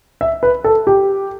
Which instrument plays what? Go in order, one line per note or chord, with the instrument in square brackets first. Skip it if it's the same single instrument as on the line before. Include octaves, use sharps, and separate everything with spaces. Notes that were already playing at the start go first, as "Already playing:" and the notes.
[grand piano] E5
B4
A4
G4